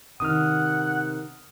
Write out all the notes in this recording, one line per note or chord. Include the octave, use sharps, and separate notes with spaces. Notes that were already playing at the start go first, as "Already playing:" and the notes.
C3 D#3 F#5 D#6 F6